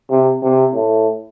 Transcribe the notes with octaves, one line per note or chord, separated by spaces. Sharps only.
C3
C3
A2